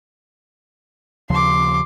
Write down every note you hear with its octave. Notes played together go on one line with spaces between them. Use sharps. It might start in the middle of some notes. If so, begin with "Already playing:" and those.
D#2 C#3 F3 C6 D6